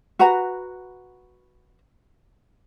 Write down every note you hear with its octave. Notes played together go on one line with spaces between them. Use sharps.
F#4 B4 F#5 A#5